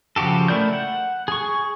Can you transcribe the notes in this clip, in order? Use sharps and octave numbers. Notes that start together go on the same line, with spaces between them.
C#3 F3 F#4 G4 A4
A3 E4 A#4 D5 G6
F#5
G#4 C#6